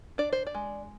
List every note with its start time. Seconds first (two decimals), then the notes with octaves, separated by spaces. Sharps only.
0.18 D4 D5
0.33 C5
0.47 D5
0.55 G#3